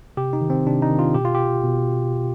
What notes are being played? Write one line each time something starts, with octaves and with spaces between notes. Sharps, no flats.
C3 G4
D#4
D#3
C4
C3 D4
D#4
D#3
F4
B2 G4
F4
G4
B2